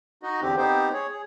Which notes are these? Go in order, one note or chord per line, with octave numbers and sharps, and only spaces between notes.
D#4 F#4 D#5
E2 D3 C4 G4
B3 C4 D#4 G4 C5
G#4 C#5
G#4